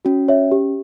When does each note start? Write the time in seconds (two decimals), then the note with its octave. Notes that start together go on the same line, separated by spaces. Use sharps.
0.05 C#4 F#4
0.28 C#5 E5
0.52 G4